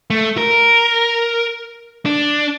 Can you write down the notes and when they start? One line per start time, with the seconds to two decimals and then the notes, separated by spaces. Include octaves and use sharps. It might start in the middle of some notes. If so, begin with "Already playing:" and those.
0.10 A3
0.38 A#4
2.06 D4